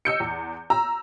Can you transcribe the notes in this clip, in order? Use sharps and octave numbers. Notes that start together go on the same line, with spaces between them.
D#5 E6 G6 C#7
E2
A#5 E6